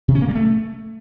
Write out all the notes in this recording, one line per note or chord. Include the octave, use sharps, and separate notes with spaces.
C3
C#4
A#3
G3
A3